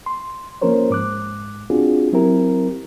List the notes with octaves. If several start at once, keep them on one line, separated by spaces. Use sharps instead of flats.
C6
F3 A#3 C#4 A#4 C5 C#5
G#2 D6 F#6
C4 D4 F4 F#4 G#4
F#3 C4 E4 G4 A#4